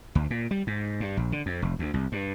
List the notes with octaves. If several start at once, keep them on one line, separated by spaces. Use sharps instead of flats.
D2
A#2
G3
G#2
G2
A#1
D3
F2
F1
D2
C2
G2